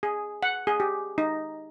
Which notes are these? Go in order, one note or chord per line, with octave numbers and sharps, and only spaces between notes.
G#4
F#5
G#4
G4
D#4